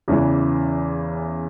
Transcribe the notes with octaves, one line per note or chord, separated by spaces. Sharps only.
E2 C#3 E3